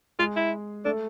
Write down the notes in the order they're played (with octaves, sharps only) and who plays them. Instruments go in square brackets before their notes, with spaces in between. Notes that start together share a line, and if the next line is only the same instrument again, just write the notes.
[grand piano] G#3 G#4 [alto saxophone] F4
[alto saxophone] E4
[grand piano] A3 A4 [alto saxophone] D4